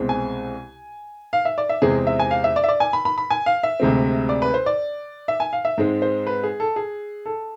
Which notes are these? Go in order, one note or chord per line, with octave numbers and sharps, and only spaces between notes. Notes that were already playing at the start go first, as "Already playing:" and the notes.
Already playing: C2 B2 G#3 C4
G#5
F5
E5
D5
E5
E2 C3 G#3 C4 G#4
E5
G#5
F5
E5
D5
E5
D5
G#5
B5
B5
B5
G#5
F5
E5
D2 C3 G#3 C4
D5
B4
C5
D5
E5
G#5
F5
E5
G#2 G#3 C4
C5
B4
G#4
A4
G#4
A4